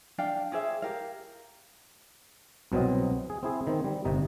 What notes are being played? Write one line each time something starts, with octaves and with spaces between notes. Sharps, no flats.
D4 D5 F5 G5
G4 G#4 C5 E5
G4 A#4 F5
C2 B2 F#3 C4 D#5
G#4
C4 E4 G#4
D#3 C4
G3
G1 C3 D#4